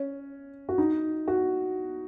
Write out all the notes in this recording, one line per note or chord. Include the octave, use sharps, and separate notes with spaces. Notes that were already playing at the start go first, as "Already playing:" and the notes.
Already playing: C#4
F#4
D#4
F#4